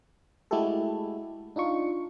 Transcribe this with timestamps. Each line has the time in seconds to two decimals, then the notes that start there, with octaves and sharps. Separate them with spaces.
0.51 G#3 A3 E4 F#4 G4 A4
1.56 D4 D#4 F4 C#6